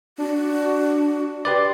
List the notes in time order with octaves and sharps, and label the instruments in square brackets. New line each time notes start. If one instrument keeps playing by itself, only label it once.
[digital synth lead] D4 [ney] F#4
[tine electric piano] G4 B4 D5 [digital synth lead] C6